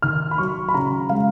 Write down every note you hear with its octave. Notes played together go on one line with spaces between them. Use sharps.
D#3 F6
B5
F#3 C#6
B5
C#3 A#5
G#3 F5